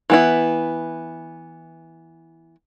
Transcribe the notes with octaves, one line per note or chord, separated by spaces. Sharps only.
E3 B3 E4